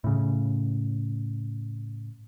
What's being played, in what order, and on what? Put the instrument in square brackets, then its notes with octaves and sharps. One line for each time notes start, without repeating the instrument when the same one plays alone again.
[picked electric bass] A2 C#3